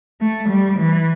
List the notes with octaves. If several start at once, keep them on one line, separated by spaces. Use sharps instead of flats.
A3
G3
E3